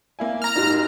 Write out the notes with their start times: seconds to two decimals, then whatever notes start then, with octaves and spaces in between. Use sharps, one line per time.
0.19 A#3 E4 G#5
0.42 A#5 F6
0.56 F#1 G#2 D#4 F#4 G4